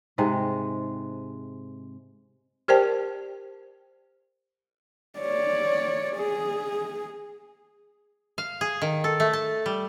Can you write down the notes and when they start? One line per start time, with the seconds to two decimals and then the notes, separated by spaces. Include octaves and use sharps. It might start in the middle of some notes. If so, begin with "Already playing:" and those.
0.18 G#2 C3 G#3
2.68 G4 A#4 C5 D5 G5 A5
5.19 C#5 D5
6.17 G#4
8.38 F5
8.61 G#4
8.82 D#3
9.04 A4
9.20 A3
9.33 A5
9.66 G3